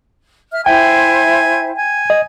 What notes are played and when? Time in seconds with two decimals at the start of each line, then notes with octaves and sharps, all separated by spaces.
0.52 E5 F6
0.66 E4 C5 E5 G5 G#5
1.78 G#5
2.10 D#5